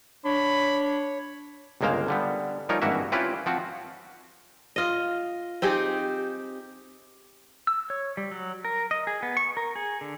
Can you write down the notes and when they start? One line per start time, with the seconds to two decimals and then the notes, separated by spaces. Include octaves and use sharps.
0.25 D4 C#5 B5
1.81 G1 C#2 G#3 A#3 C5 F5
2.08 D3 G3 B3
2.69 F3 G3 D#4 F4 A#4 C#5
2.82 G#1 G2 E3 A#3 F#4 E5
3.12 C4 C#4 E4 F4 G4 B4
3.46 F3 C4 F#4
4.76 F4 D#5
5.62 C4 D#4 G4 G#4
7.67 E6
7.90 C#5
8.17 G3
8.31 F#3
8.65 A#4
8.91 D#5
9.07 G#4
9.23 B3
9.37 C#6
9.57 A#4
9.76 G#4
10.01 D3